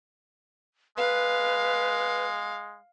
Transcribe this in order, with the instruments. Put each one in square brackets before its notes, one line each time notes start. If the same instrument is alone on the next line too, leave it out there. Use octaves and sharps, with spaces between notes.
[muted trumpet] G#3 [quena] B4 [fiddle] F5